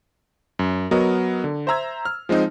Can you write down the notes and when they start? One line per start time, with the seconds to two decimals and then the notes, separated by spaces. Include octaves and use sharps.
0.59 F#2
0.91 F#3 B3 F#4 A#4 D#5
1.44 D3
1.67 C5 E5 A#5 E6 G#6
2.05 F6
2.29 F3 G#3 C4 D#4